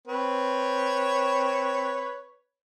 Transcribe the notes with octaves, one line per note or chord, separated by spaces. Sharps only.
C4 B4 C#5